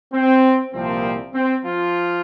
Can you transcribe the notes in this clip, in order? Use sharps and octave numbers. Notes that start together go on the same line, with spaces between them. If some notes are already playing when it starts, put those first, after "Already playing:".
C4
C2 A#2 F3 C4
C4
F3 F4